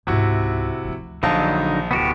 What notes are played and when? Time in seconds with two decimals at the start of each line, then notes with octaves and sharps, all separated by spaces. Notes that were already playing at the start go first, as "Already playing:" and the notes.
0.07 C#2 G#2 C3 E4 F#4
0.84 D2 F3
1.23 A#1 D3 D#3 F#3 D#4 F5 A5
1.91 D1 B3 F#4 G4